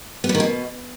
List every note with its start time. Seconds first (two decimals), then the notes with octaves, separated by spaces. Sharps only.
0.24 B3
0.29 G3
0.35 D#3
0.40 B2